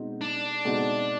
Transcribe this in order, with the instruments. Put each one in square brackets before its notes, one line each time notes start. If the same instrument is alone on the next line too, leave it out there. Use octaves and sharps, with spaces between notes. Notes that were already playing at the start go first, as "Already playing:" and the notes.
Already playing: [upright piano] B2 G#3 C4 D#4 F#4
[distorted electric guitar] D4
[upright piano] B2 G#3 C4 D#4 F#4